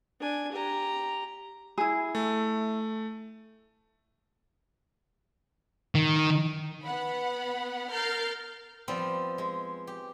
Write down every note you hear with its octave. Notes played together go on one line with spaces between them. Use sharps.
D4 G#5
G4 A#5
E4 G#4
A3
D#3
B3 F#5 B5
A#4 F6 G6 A6 C7
F3 G3 B3 C4
G#3
G4